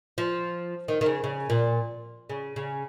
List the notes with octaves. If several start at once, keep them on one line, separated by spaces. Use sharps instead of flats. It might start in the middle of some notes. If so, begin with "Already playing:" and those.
F3
D#3
D#3
C#3
C#3
A#2
C#3
C#3